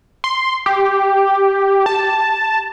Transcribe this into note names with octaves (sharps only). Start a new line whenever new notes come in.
C6
G4
A5